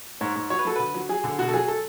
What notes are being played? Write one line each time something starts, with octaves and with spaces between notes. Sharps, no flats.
G#2 C#5
G#2
F#3 C#5
B4
F#3 A4
D3 B4
F#3
F#3 G#4
D3
B2 F#4
A4
F#3 G#4
A4